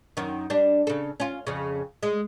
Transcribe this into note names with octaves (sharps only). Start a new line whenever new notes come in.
F#2 D#3
G3 D4
C#3 A4
C#4 F4
F2 C#3
G#3